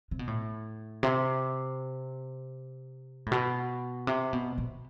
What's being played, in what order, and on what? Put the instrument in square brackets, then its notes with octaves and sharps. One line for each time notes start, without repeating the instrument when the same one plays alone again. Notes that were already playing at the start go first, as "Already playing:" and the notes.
[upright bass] C3
B2
A2
C3
A2
B2
C3
B2
B2